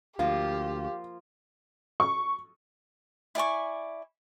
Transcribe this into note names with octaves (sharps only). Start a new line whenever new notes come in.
D2 F3 A#3 F4 G4 F5
C#6
E4 D5 G#5 C#6